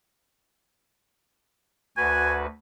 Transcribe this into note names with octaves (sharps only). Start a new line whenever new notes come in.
D2 F#4 B4 G#5